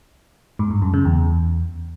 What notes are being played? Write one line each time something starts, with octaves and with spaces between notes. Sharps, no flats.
G#2
G2
F#2
C#3
E2